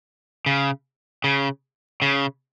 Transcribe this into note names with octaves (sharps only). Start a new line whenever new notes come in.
C#3
C#3
C#3